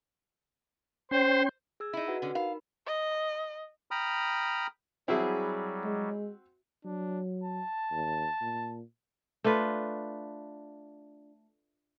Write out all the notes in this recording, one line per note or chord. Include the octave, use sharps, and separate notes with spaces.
C#4 C5 G5 C6
G#4 E6 G#6
D#4 E4
F#4 B4 F#5
D3 C#4
D#4 A#4 F5 B5
D#5
G5 A#5 B5 D#6 F6
F#3 G3 C4 E4 F#4 G#4 E5
G#3
F#3 D4
A5
D#2
A#2
A3 D4 F4 B4